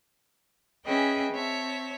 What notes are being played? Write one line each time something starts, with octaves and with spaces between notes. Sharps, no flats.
C#4 G#4 B4 D#5 E5 G5
C4 C#5 E5 A5